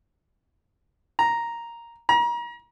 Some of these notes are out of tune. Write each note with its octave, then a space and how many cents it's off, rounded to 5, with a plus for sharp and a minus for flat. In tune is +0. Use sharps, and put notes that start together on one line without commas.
A#5 +0
A#5 +35